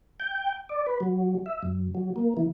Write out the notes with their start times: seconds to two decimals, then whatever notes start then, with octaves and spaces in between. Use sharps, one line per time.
0.20 G5
0.69 D5
0.86 B4
1.00 F#3
1.46 E5
1.63 F#2
1.95 F#3
2.16 A#3
2.37 E3